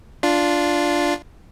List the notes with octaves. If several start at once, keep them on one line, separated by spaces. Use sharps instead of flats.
D4 F4